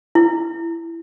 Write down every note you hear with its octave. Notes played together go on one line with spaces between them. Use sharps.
E4